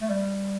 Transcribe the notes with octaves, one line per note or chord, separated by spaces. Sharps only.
A3
G3